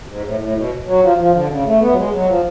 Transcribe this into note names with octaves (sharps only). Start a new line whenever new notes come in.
G#2
A2
A2
B2
F#3
F3
F3
D3
B2
C#3
A3
B3
F#3
G#3
F#3
F3